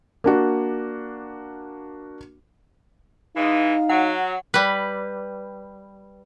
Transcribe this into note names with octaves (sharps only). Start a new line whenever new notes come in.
A#3 D4 F#4
E3 G#3 D#4 F5
F#3 F#5
G3 B4